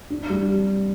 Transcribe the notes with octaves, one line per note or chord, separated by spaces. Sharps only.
D4
G3